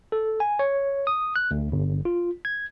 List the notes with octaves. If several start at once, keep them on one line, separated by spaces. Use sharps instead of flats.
A4
G#5
C#5
D#6
F#6
D2
G1
F4
G#6